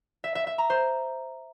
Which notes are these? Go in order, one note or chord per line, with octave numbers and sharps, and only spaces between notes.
E5
E5
E5
A#5
C5